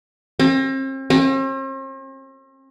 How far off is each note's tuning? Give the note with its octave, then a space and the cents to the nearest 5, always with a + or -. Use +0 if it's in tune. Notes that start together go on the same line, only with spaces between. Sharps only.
C4 +40
C4 +45